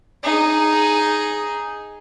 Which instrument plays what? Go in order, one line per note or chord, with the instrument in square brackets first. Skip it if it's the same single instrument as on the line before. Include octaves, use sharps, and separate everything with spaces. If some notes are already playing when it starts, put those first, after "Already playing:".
[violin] D#4 G#4